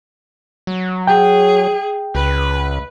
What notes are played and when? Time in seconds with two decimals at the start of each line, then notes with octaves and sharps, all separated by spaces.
0.67 F#3
1.07 G#4 G5
2.15 C#2 B4